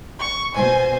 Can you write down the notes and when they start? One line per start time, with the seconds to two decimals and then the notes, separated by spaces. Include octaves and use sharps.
0.19 C#6
0.55 B2 C5 G#5